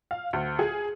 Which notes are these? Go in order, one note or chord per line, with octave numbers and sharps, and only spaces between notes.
F5
D2
G#4